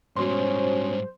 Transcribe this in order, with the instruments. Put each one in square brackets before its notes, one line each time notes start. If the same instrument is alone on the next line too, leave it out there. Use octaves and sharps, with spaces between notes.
[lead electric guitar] G#2 G3 [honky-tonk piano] B2 C6 [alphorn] C#4 [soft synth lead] C5